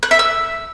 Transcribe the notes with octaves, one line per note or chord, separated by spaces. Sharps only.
F#6
E5
E6